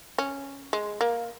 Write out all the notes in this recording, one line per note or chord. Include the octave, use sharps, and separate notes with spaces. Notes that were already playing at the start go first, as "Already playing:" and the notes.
C#4
G#3
A#3